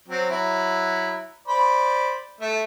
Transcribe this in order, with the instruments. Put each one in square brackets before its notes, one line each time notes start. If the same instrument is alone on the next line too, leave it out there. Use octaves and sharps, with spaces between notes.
[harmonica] F#3 C4
F#3 E4
C5 D5 B5
A3 E5